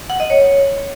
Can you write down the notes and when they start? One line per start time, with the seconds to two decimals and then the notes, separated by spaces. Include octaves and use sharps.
0.10 F#5
0.20 D#5
0.30 C#5